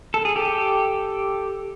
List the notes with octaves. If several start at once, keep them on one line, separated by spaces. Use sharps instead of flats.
A4
G#4
G4 A4